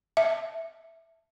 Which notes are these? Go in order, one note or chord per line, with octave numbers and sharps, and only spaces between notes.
E5